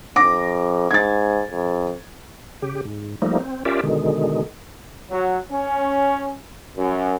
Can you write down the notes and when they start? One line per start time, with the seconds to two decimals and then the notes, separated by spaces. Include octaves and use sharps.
0.16 F2 D6 A#6
0.91 G#2 G#6 A6
1.50 F2
2.62 C#3 G4
2.85 G#2
3.22 F3 G3 A3 A#3 D#4
3.39 C4
3.65 C#4 F4 G4 A#4 D5 E5
3.83 B2 D3 D#3 G#3
5.10 F#3
5.50 C#4
6.77 F#2